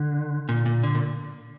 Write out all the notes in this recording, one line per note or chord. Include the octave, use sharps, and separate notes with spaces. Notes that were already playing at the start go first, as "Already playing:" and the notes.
Already playing: D3
A#2
A#2
D3
A#2